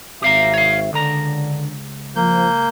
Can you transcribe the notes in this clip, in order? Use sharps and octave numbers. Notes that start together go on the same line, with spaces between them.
G#1 C4 G4 E5 F5 A#5
C#5 F5
C#2 D3 A#5
F3 A#3 G6